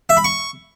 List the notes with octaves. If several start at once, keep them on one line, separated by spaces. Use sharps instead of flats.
E5
B5
C#6